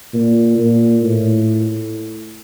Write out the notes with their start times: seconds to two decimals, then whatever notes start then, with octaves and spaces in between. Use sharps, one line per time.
0.14 A#2
0.58 A#2
1.03 A2